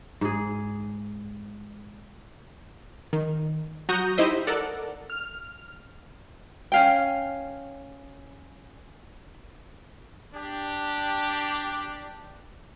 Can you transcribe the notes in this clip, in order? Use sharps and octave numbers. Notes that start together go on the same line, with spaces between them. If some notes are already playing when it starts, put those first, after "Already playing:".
G#2 G#4
D#3
F#3 F#4 A#5 D#6 G6 A#6
D#4 E4 G4 C5 D#5 E5
A4 A#4 D5 F#5
F6
C#4 F5 G5
D4 G4